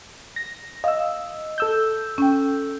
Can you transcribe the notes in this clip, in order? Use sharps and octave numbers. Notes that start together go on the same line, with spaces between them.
A#6
D#5 F5 E6
A4 E6 G6
C#4 G5